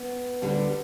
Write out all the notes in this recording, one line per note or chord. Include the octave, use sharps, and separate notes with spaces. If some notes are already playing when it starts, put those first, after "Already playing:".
Already playing: B3
D2 D3 G3